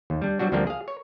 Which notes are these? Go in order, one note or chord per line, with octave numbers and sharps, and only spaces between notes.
D#2
G3 D4
F#3 G3 D4 F#4
D2 F3 G3 A#3 C4 D4
G#4 F5
C#5